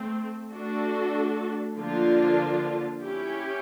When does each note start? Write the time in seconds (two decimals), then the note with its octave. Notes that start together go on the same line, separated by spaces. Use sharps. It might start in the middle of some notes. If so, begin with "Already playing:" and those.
Already playing: A3 C4
0.51 A3 D4 F#4 A4
1.77 D3 F3 A#3 D4 F4
3.04 C#4 E4 G4